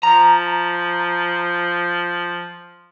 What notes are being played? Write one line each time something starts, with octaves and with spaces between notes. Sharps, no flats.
F3 A#5